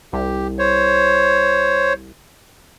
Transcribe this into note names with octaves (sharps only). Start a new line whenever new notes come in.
C2 G4
C5 C#5